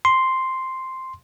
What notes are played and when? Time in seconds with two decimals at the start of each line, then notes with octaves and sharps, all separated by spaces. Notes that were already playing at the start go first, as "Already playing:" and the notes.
0.05 C6